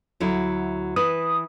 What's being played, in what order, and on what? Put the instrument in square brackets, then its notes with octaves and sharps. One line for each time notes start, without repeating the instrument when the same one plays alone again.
[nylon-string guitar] D2 F#3 E4
[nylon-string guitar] E3 B4 [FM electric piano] D#6